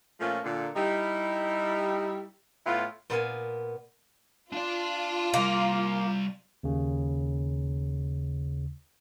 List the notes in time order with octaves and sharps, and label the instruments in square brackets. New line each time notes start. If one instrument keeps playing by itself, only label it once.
[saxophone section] A#2 F3 A3 A#3 C#4 F4
A#2 D3
G3 D#4 E4
A2 B3 E4 F4
[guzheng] A#2 B3 F5 G#5
[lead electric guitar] D4 D5 [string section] F4
[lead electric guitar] C3 G3 [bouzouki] A#3
[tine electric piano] D#2 C#3